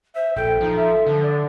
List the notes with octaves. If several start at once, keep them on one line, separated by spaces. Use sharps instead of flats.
C5 E5
A#1 A4 G5
F3 D#4
E5
D3 F3
D5